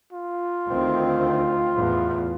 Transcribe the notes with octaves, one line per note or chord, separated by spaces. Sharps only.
F4
D2 D#3 C4
E2 A2